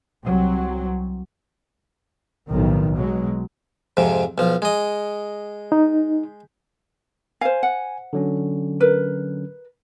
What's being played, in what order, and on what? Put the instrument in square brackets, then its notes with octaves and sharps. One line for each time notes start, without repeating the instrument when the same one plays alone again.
[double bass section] C2 F#3 C4
B1 F2 A2 D#3
B2 F#3 G#3
[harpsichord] F2 G#2 C3
B1 F3
G#3 D#5
[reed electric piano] D#4
[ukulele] C5 F5 [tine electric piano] G#5
[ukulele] F#5
[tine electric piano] D3 F#3 C#4
[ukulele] A#4 B4